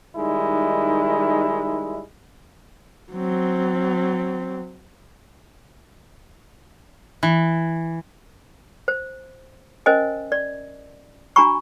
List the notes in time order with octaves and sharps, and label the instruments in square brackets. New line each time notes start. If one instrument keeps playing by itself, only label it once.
[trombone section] D#3 G3 G#3 D#4 E4
[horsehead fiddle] F#3 C4
[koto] E3
[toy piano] C5
C#4 A#4 C5 D#5 G#5
D5
D4 F#4 G#5 A#5 B5 C#6